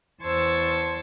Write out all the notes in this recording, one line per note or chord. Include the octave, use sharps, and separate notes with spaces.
E2 C5 A5 C#6 E6 G#6